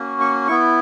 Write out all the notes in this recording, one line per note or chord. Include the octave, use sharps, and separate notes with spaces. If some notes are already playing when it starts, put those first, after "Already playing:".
Already playing: A#3 C#4 F#4
C#6
B3 E4 C#6